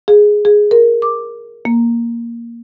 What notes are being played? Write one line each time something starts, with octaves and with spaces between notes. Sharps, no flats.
G#4
G#4
A#4
D6
A#3